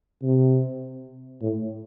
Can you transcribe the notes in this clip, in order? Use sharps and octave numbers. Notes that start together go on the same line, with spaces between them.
C3
A2